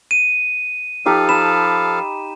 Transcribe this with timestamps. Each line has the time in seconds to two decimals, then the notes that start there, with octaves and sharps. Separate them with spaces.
0.11 D#7
1.06 F3 D#4 G4 A4 F5
1.29 B5 E7